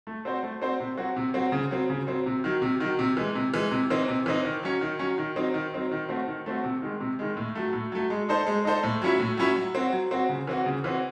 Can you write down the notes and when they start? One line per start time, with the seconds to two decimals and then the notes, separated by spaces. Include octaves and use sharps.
0.07 A3
0.25 C4 F#4 C5
0.43 A3
0.62 C4 F#4 C5
0.80 C3
0.97 F#3 C4 F#4
1.16 C3
1.34 F#3 C4 F#4
1.52 C#3
1.71 F#3 C4
1.90 C#3
2.07 F#3 C4
2.26 C3
2.44 D#3 F#3
2.62 C3
2.80 D#3 F#3
2.99 C3
3.17 E3 G#3
3.35 C3
3.54 E3 G#3
3.72 C3
3.90 E3 C4 D#4
4.08 C3
4.26 E3 C4 D#4
4.45 D#3
4.63 F#3 C#4
4.81 D#3
4.99 F#3 C#4
5.18 D#3
5.36 F#3 C4 D#4
5.54 D#3
5.73 F#3 C4 D#4
5.91 D#3
6.09 A3 C4 F#4
6.27 D#3
6.46 A3 C4 F#4
6.64 C3
6.82 D#3 G#3
7.00 C3
7.19 D#3 G#3
7.37 A2
7.55 F#3 A3
7.73 A2
7.92 F#3 A3
8.10 G#3
8.29 D#4 A4 C5
8.47 G#3
8.65 D#4 A4 C5
8.83 A2
9.02 F#3 C#4 E4
9.20 A2
9.37 F#3 C#4 E4
9.56 F#3
9.75 C4 F#4
9.92 F#3
10.11 C4 F#4
10.29 C#3
10.47 E3 C4 F#4
10.66 C#3
10.84 E3 C4 F#4